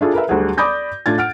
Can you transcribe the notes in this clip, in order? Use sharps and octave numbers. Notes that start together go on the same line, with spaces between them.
D4 E4 F4 G#4 A4
A#4 B4 E5
D2 F#3 G3 F#4 G#4 F#5
D5 B5 D6 D#6 G6 A#6
A2 D4 F4 G#6 A6
F#5 F6 D7